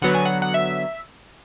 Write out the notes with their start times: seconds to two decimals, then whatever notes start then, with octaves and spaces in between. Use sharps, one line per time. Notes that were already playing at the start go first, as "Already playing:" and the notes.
0.02 D3 F#3 B3 F#5
0.15 G#5
0.25 F#5
0.42 F#5
0.54 E5